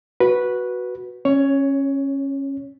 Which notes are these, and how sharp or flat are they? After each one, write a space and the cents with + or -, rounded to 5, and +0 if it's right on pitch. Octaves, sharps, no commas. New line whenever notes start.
F#4 +0 B4 -10
C#4 -15 C#5 +10